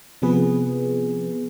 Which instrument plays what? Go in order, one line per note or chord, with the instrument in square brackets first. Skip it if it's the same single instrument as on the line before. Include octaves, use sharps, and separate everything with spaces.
[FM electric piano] C3 F3 B3 G#4 B4